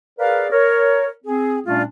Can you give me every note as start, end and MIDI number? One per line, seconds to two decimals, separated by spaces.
0.19 0.47 68
0.19 0.47 70
0.19 0.47 71
0.19 0.47 74
0.19 0.47 77
0.52 1.08 70
0.52 1.08 73
1.25 1.59 60
1.25 1.59 68
1.66 1.82 46
1.66 1.82 55
1.66 1.82 57
1.66 1.82 61
1.66 1.82 62
1.66 1.82 65